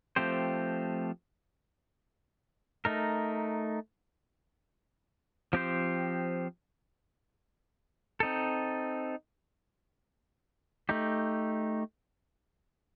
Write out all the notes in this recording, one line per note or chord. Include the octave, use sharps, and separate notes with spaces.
F3 A3 C4 G4 C5
A3 D#4 A#4
F3 C4 G4 C5
C4 D#4 A4
A3 D#4 G4